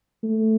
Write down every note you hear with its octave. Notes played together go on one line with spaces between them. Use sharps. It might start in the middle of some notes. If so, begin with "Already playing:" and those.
A3